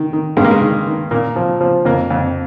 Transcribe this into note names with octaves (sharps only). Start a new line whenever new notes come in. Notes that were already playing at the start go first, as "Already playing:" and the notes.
Already playing: D#3
D#3
G2 G#3
A#3
G#3
D#3
D#3
A#2 A#3
F3
F3
F2 A#3
F2